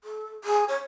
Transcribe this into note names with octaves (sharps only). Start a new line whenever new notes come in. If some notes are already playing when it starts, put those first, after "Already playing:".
A4
G#4
C#5